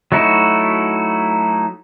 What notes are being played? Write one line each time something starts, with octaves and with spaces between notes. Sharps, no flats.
F#3 A3 D#4 E4 F#4